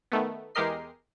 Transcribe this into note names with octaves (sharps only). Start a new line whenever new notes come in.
D#3 A3 B3
E2 G#3 G4 A#4 D#5 C7